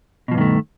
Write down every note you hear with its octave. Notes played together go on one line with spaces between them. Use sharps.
G2 B2 D#3 F3 A3